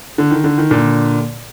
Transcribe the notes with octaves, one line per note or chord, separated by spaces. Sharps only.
D3
D#3
D3
D#3
A#2 D3